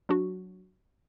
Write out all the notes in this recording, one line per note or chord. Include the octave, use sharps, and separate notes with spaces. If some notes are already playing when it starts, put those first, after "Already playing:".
F#3 D4 F#4